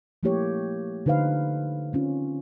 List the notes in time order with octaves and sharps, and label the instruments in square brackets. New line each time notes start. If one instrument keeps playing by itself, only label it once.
[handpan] F3 A3 A#3 E4 G4 C#5
D3 D#4 B4 C5 F5
C4 C#4 F4